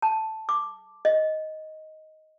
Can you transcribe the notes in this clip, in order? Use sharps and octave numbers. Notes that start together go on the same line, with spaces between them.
A5
D6
D#5